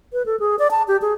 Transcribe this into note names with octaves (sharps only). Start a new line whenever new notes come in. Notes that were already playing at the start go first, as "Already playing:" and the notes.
B4
A4
G#4
D5
A5
G4
G#4